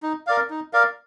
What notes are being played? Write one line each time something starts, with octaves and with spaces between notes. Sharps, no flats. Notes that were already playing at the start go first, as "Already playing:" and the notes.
D#4
A#4 D5 F5
D#4
A#4 D5 F5